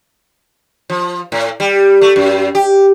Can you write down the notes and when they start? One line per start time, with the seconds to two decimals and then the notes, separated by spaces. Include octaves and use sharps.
0.90 F3
1.32 A2
1.60 G3
2.01 A3
2.16 F#2
2.55 G4